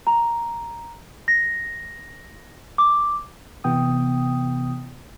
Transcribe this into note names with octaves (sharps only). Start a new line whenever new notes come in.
A#5
A#6
D6
C3 E3 B3 G5 D#6